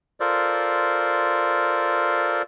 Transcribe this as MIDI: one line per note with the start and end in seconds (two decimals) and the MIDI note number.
0.20 2.42 65
0.20 2.42 69
0.20 2.42 70
0.20 2.42 72
0.20 2.42 74